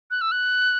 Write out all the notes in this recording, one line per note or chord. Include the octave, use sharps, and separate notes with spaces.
F#6
E6
F#6